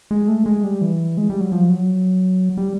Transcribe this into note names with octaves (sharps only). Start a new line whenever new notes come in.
G#3
A3
G#3
G3
E3
G#3
G3
F#3
F3
F#3
G3